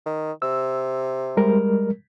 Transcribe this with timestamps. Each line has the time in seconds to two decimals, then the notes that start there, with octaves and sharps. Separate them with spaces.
0.06 D#3
0.42 C3 E6
1.37 G3 G#3 A#4